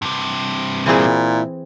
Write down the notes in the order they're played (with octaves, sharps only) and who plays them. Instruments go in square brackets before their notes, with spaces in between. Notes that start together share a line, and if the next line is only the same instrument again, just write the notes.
[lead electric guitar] G2 C3
[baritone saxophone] A#2 [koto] E3 C4 G#4 [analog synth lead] E4